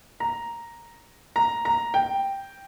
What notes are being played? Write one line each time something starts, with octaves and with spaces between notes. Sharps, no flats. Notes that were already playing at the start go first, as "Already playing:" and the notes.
A#5
A#5
A#5
G5